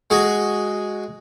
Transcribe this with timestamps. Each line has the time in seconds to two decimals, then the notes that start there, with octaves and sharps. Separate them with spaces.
0.10 G#3 F#4 G#4